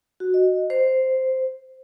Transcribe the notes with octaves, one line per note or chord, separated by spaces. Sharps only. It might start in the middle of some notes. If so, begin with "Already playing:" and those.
F#4
D#5
C5